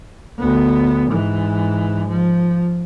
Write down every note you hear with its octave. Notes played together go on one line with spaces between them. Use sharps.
D2 B3
G#2 E3
F3